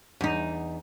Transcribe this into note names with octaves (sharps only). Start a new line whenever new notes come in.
E2 D#4